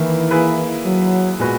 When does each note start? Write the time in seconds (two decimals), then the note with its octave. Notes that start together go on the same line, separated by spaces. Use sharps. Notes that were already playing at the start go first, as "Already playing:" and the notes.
Already playing: D#3 E3 A#3 E4
0.31 A#3 E4 G#4 B4
0.85 F#3
1.39 A#2 G#3 B3 F#4 B4